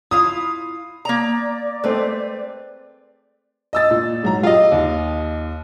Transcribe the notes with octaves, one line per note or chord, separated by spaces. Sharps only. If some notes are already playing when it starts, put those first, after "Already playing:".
E4 F4 F5 D#6
A#3 D5 A#5
G#3 A3 C4 B4
D#5 E6 A6
A#2
G#2 F#3 A#5
F4 G4 D#5
D#2